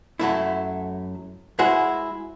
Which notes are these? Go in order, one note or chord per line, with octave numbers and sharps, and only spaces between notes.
F#2 F#3 A3 E4
G#3 E4 F#4 G#4 C5